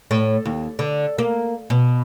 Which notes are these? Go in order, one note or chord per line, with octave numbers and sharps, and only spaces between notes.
A2
D#2
D3
A#3
B2